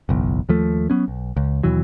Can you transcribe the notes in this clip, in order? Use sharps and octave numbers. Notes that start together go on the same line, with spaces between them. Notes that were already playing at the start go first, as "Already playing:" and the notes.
F#1 B1 E2
D#2 F3 A3
F#3 B3 C#4
B1
C#2
D#2 B2 E3 F#3